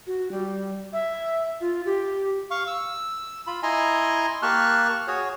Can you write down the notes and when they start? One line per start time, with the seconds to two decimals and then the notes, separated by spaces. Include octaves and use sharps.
0.07 F#4
0.31 G3
0.93 E5
1.61 F4
1.85 G4
2.51 F5 C#6
2.67 E6
3.47 F4 B5
3.63 E4 D#5 G#5 A#5 C6
4.43 A#3 G4 A5 C#6 F6 F#6
5.08 F#4 G#4 C#5